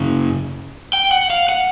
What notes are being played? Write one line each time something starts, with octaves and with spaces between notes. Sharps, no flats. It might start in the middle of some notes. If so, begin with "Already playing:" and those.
Already playing: F#2 C#3
G5
F#5
F5
F#5